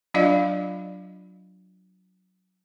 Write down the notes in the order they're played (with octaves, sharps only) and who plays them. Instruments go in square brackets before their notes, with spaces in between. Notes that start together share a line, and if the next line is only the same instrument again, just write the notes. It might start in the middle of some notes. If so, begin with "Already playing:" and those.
[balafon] F#3 D4 F4 D5 D#5 F5